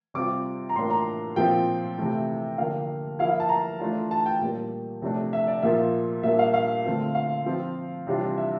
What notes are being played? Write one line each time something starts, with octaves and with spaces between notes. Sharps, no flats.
C3 G3 C4 F4 D6
A#5
A2 E3 A#3 D4 F4 C6
A#5
A#2 F3 C4 F4 G5
C3 E3 A3 E4
D3 F3 A#3 D4 F5
F3 A#3 E4 F5
F5
A5
A#5
E3 A3 D4 F4
A5
G5
A#2 G3 A#3
C3 F3 A3 D4
E5
D5
A#2 F3 A#3 F4 E5
A#2 G3 A#3 D4 E5
F5
F5
D3 A3 C4 F4
F5
F3 C4 F4
C3 E3 G3 D4 F4
E5